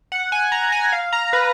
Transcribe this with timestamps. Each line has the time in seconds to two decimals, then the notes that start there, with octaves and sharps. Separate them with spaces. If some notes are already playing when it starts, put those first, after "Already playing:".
0.12 F#5
0.32 G#5
0.52 A#5
0.72 G#5
0.92 F5
1.13 A#5
1.33 B4